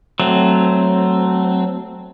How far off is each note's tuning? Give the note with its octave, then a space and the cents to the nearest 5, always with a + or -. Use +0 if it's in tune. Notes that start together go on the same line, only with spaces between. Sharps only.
F#3 +10 A3 +0 C4 +0